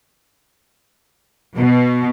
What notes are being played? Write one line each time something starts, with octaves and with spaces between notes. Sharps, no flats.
B2